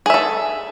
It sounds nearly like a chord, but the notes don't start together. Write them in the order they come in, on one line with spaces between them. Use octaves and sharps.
G#4 E5 A4